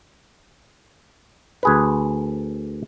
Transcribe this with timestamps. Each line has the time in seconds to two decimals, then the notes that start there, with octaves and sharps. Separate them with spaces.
1.63 D2 G#4 B4